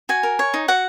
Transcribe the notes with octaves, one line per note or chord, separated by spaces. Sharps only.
F#4 G#5
A#4
C#5
D#4
F#4 F#5